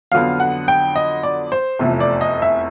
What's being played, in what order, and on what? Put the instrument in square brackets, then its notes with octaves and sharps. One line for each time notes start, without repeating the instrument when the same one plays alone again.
[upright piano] F2 D3 F#3 B3 F5
F#5
G5
D#5
D5
C5
F1 E2 C3 F3 A3
D5
D#5
E5